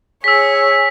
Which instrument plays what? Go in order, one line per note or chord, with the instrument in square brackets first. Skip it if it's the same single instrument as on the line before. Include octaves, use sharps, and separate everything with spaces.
[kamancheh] G#4 C#5 [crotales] E6 B6